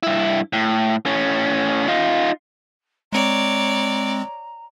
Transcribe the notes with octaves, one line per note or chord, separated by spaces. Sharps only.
G2 E4
A2
A2 C#4
D#4 F4
G#3 C4 C#5 D5 A#5